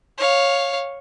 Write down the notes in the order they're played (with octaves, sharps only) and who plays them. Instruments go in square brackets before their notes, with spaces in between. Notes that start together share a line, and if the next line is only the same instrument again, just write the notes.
[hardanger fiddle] C#5 F5